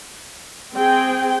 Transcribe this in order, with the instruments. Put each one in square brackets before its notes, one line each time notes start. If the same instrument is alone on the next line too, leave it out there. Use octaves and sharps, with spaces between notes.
[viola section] C4 G#4 G5